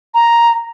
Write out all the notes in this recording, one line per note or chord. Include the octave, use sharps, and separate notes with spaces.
A#5